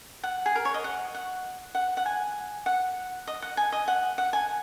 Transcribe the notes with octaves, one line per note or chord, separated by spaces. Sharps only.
F#5
G#4
A#4
C#5
D#5
F#5
F#5
F#5
F#5
G#5
F#5
D#5
F#5
G#5
D#5
F#5
F#5
G#5